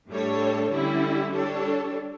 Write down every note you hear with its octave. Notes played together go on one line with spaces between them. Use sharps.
A2 G3 D4 A4 C#5
D3 G3 C#4 E4
G3 D4 A4 C#5